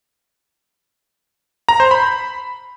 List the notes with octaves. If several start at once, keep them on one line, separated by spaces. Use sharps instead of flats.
A#5
C5
B5